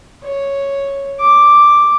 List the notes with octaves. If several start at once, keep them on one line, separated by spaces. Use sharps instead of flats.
C#5
D6